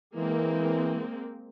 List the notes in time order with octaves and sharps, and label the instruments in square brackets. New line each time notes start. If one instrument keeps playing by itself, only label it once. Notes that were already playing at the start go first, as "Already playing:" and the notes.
[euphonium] E3 [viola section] G#3 A#3 C4